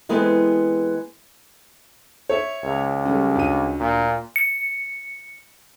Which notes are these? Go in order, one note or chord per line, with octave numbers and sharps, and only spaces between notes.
E3 G#3 B3 C4 A4 B4
C#5 E5
C#2
G3 A3 C#4
D2 D#7
A#2
C#7